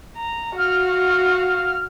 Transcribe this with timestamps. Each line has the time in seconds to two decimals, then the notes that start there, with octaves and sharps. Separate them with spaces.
0.17 A#5
0.57 F#4 F5 F6